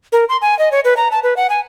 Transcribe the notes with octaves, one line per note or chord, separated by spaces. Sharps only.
A#4
C6
G#5
D#5
C#5
B4
A#5
A5
B4
F#5
G#5